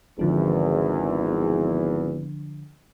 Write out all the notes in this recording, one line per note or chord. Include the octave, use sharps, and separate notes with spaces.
G#1 E2 D3 F3 D4